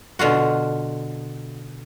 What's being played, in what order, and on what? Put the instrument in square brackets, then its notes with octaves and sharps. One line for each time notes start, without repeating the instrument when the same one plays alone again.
[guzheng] B2 D3 F4 F#4